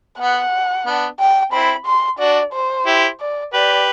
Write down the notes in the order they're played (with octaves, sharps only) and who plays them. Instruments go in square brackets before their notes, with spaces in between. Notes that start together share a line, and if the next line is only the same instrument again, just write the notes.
[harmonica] B3 [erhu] F#5
[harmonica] B3 D4
[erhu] G5
[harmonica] C4 E4 [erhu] B5
[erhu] C6
[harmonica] D4 F#4 [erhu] D5
[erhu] C5
[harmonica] E4 G4
[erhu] D5
[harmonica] G4 B4 [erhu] D5